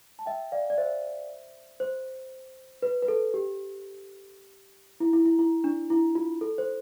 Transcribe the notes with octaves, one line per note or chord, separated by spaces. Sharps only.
A5
E5 G5
D5 F5
D5
C5 E5
C5
B4
B4
A4
G4
E4
E4
E4
E4
D4
E4
F4
A4
C5